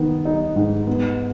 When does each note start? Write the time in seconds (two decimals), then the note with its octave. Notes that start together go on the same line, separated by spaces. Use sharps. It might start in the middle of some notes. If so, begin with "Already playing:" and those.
Already playing: D#3 B3
0.25 D#4
0.56 G#2
0.87 B3